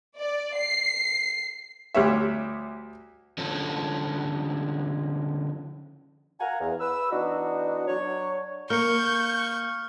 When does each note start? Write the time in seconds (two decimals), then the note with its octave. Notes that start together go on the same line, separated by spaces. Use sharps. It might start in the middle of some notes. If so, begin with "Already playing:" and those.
0.20 D5
0.57 C7
1.95 D2 G3 C#5 E5
3.38 D3 F3 C#4 A4
6.40 F5 F#5 G#5 A#5
6.60 E2
6.81 B4 E6
7.11 E3 B3 D4 D#4 F#4
7.87 F#3 D4 C#5
8.70 A#3 C#6 F6 G6 C#7